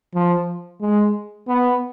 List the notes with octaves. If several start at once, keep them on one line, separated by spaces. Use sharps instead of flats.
F3
G#3
B3